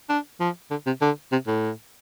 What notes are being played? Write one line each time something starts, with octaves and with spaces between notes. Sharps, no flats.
D4
F3
D3
C3
D3
C3
A2